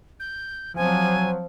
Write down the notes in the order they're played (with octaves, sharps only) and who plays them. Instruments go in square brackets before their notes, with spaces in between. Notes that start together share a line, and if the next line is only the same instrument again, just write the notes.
[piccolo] G6
[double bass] F3 C4 [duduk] F#3 [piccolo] G#5